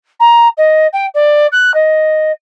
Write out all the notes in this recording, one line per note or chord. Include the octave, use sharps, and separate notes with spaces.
A#5
D#5
G5
D5
F#6
D#5